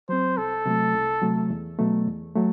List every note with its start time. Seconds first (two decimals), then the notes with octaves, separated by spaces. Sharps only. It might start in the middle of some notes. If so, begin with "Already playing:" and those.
0.09 F#3 C4 C5
0.37 C2 A4
0.66 C3 F#3 A3
0.95 C2
1.22 C3 F#3 A3
1.50 E2
1.79 B2 F#3 A3
2.07 E2
2.35 F#3 A3